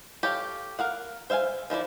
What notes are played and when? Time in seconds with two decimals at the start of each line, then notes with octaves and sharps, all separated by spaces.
0.23 G4 A4 C#5 F5
0.79 A#4 F5 F#5
1.30 C5 E5 F5 G5 G#5
1.70 D#3 F3 E4 D5